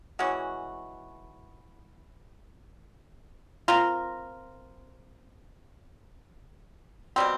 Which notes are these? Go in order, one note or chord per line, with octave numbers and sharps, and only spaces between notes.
E3 G#3 C#4 F#4
C4 F4 A#4
B2 G3 C4